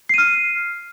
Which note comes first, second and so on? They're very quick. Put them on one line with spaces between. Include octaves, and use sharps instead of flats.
C7 D#7 F6